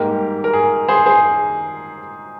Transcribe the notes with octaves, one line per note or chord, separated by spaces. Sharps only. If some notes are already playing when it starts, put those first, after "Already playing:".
Already playing: G#2 G3 A#3 G4 A#4
A#4
G#4
G#4 C5
G#4 C5